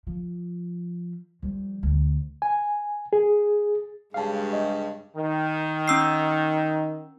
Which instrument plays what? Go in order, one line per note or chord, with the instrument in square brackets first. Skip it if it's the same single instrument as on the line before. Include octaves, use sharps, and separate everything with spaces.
[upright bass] F3
F3 G3
D2
[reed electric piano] G#5
G#4
[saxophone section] G2 C#3 [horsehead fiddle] G#3 G4 [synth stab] A4 F5
[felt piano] D#5
[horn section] D#3
[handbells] C#4 E6 C7